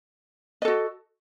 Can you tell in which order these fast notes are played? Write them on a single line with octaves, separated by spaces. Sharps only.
D#5 A4 F#4